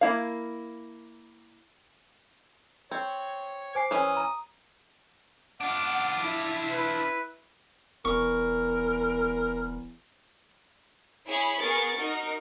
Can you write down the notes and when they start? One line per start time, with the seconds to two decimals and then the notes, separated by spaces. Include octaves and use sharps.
0.01 A#3 E4 F5
2.91 C4 C#5
3.75 C5 G#5 D6 C7
3.91 E3 C#4 D#6
4.17 A#5
5.61 D4 F4 F#5 D6
6.20 E4
6.70 B4
8.05 E1 E2 A#4 C#6
11.27 E4 G#4 C#5 B5
11.60 B3 G#4 A#4 C#6 A6
11.96 D#4 F#4 A#4